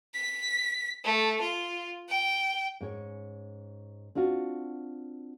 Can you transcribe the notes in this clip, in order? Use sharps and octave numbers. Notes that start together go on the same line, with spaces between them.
B6
A3
F4
G5
G#2 C#4 C#5
C4 D4 F4 F#4